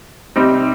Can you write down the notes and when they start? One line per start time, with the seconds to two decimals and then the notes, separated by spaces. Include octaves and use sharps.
0.36 C3 G3 C4 D#4 G4